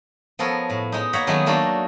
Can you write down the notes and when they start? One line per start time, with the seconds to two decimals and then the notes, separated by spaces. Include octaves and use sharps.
0.39 F3 B3 A4 A#4 C#5
0.70 A2
0.92 G#3 D#4
1.13 A#3 C#5 F#5 A#5 B5
1.27 D#3 F#3 A3 B3 G#4
1.46 A3 A#3 D4 D#4 F#4 A4